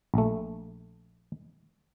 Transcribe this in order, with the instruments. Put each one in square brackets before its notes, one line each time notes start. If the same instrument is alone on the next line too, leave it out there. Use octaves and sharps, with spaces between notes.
[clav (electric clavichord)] A#1 A3